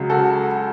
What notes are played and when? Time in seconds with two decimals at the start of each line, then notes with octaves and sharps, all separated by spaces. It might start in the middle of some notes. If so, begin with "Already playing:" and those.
Already playing: C#2 C#3 F#3
0.10 F#4 A4